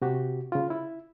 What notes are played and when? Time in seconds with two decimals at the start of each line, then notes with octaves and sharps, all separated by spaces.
0.02 C3 F#4 G4
0.52 C#3 F4
0.70 E4